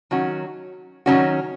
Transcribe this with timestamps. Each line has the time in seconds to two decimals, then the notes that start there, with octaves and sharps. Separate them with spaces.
0.11 D#3 F#3 C#4 F#4
1.06 D#3 F#3 C#4 F#4